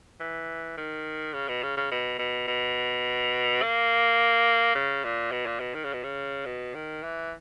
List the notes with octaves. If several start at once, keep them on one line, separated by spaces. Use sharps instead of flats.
E3
D#3
C#3
B2
C#3
C#3
B2
B2
B2
A#3
C#3
A#2
B2
A#2
B2
D#3
C#3
B2
C#3
B2
D#3
E3